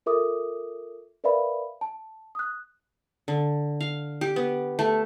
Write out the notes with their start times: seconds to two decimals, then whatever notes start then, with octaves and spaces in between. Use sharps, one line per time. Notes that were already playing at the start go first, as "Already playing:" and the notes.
0.06 F4 A4 A#4 E5 D6 D#6
1.24 A#4 B4 D5 E5 F5 B5
1.81 A5
2.35 D#6 F#6
3.28 D3
3.80 F5
4.21 G4
4.36 B3
4.79 A3